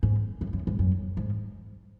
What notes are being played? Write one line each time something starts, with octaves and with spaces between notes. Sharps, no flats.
G#2
F#2
F#2
G#2
F#2
G#2